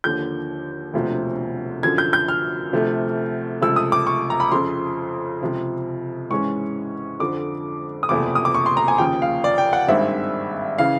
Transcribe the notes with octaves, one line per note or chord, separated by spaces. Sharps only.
D#2 D3 F3 G6
E1 D2 C3 F3
F#2 D3 F3 G#6
G6
G6
F6
D2 C3 F3 A3
C#2 C3 F3 A3 E6
D#6
D6
C#6
A#5
B5
F2 C#3 F3 C6
C#2 C3 F3
G#2 E3 G#3 C#4 C#6
F2 D3 F3 D6
D#6
F#1 E2 C3 F3 A3 D6
D#6
D6
C#6
C6
A#5
G#5
D#2 C#3 F3 G5
F5
D5
G5
F#5
G#1 G2 D#3 G#3 C4 E5
C#3 E3 F5